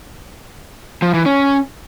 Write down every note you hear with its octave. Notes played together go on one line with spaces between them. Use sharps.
F3
E3
C#4